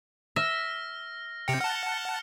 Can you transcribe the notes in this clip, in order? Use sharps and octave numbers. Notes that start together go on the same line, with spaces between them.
E5 F6 A#6
C3 G5 C#7 F7
F#5 A5 F6